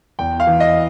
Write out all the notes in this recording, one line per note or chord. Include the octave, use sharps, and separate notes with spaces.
E2 G5
F5
E3
D#5